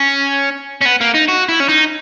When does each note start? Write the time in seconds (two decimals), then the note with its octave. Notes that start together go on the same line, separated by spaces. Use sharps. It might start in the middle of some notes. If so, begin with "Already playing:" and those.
Already playing: C#4
0.81 C#4
0.86 B3
1.01 A#3
1.14 D#4
1.28 F#4
1.49 E4
1.60 C#4
1.69 D#4